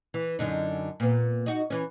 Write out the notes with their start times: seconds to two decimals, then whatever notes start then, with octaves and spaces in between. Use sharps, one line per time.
0.14 E3
0.39 F#2 D3 D#4
1.00 A#2 B3
1.46 D#4 F#4
1.70 E3 C#4